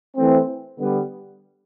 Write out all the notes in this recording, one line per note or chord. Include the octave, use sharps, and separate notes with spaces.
E3 A3 C4
D3 G3 B3